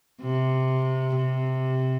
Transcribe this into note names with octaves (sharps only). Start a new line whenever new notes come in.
C3
C3